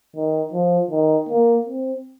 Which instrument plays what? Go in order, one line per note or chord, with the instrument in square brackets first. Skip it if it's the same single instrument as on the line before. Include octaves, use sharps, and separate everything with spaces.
[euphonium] D#3
F3
D#3
A#3
C4